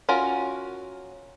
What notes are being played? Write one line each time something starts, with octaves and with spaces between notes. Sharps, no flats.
C#4 F4 F#4 A#4